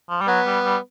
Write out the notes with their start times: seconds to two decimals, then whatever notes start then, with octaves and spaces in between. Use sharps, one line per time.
0.10 F3
0.21 G3
0.28 F#3 B3
0.46 G3
0.64 G3